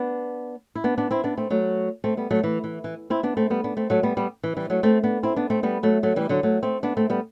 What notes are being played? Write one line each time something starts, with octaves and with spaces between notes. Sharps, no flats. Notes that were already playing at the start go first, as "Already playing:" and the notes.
Already playing: B3 D4
E4
B3 D4
B3 D4
C4 E4
B3 D4
A3 C4
F#3 A3
A3 C4
G3 B3
F#3 A3
E3
E3
E3
C4 E4
B3 D4
A3 C4
G3 B3
B3 D4
A3 C4
F#3 A3
G3 B3
G3 B3
E3
E3 G3
F#3 A3
A3 C4
B3 D4
C4 E4
B3 D4
A3 C4
G3 B3
F#3 A3
F#3 A3
E3 G3
D3 F#3
F#3 A3
A3 C4
B3 D4
A3 C4
G3 B3